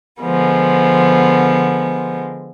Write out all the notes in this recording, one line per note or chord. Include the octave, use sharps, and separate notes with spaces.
D3 F3 G#3 B3